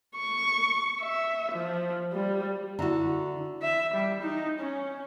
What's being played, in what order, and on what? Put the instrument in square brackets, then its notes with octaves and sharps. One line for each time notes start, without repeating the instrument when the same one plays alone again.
[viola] C#6
E5
F3
G3
[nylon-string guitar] D3 F#4 [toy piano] E4 E5 A#5
[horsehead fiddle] E5
G3
D#4
C#4